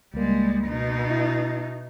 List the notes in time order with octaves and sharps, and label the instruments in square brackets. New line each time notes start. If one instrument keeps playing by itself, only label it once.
[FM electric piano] C#2 A#3 [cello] G3 G#3
[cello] B2 D#4
[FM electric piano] E4